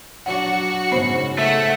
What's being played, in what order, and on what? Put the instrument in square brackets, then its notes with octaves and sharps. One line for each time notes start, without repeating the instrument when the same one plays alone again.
[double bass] F#3 D4 [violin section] F#4 C#7 [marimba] F#5
[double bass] G#2 C#3 [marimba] B3 C5
[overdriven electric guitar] A3 [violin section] E5 F#5